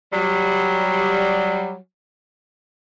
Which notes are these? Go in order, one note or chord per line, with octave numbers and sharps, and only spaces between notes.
F#3 G3